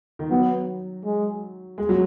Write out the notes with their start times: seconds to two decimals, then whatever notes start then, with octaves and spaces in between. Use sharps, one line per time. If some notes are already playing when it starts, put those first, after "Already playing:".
0.19 D#3
0.30 F#3 B3
1.04 G#3
1.78 G#3
1.89 F#3